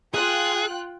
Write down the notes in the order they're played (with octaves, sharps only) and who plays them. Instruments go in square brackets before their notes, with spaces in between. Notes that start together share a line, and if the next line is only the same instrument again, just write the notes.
[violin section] F4 G5 F#6 [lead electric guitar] G#4